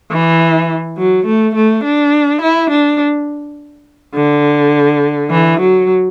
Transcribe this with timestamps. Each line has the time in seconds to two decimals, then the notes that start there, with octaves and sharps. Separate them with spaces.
0.11 E3
0.97 F#3
1.25 A3
1.55 A3
1.84 D4
2.41 E4
2.70 D4
4.15 D3
5.31 E3
5.60 F#3